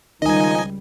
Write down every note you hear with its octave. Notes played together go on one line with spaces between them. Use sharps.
C#2 D#3 F3 G3 D#4 D#5 G#5